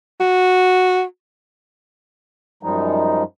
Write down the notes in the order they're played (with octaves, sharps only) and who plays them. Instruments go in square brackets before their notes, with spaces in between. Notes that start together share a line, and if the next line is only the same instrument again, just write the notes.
[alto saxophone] F#4
[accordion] F#2 F3 G3 G#3 D#4